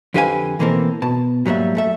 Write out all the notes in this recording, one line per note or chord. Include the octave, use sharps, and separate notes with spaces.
F2 D3 G4 B4 F5 G#5
B2 E3 A#3 C4 A4 A#4
B2 A5
G#2 F#3 G3 A#3 E5
F#2 A3 E5